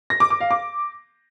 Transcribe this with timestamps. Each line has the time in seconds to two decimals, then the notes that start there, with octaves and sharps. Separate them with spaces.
0.10 A#6
0.20 D6
0.30 D6
0.40 F5
0.51 D6